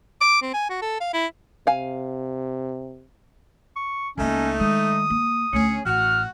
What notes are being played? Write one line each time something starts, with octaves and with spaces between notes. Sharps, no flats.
D6
C4
G#5
F#4
A4
F5
E4
C3 F5 G#5
C#6
C#2 A3 A#3 C#4 D#4
D#3 G#3 D#6
A#3
D2 A3 C#4 G#4 C#7
A1 F#4 F#5 F6